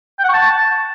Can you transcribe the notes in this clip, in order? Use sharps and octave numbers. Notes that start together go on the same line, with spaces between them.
G5
F#5
C#6
A5